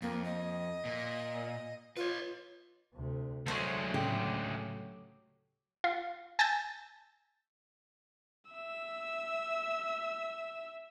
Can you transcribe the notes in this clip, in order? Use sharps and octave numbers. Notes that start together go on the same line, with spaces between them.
F2 A#3
D#5
A#2
F4 B4 C#5
D2 C3
D2 F#3 G#3 A3 A4 C5 C#5
A2 C#3 G4
F4
G#5 A5 E6 G6 A6
E5 E6